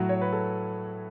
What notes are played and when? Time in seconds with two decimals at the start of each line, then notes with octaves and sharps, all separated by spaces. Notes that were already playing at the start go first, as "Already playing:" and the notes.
Already playing: A2 F#3 F#4
0.09 C#5
0.21 B4
0.33 A4